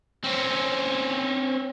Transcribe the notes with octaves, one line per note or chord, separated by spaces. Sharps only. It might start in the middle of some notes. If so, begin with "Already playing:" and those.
C4 C#4